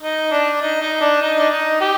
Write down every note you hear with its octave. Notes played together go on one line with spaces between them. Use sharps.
D#4
D4
D#4
D#4
D4
D#4
D4
D#4
G4